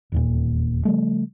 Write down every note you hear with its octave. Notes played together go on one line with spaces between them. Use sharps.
E1 D#2 A#2
C#3 F3 G3 A3